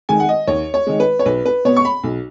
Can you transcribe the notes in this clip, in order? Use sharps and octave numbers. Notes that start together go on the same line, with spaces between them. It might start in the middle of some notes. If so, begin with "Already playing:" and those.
D#3 G#3 G#5
F#5
D#5
D#2 C#5
C#5
D#3 G#3
B4
C#5
B1 B4
B4
B2 B3 C#5
C#6
B5
B1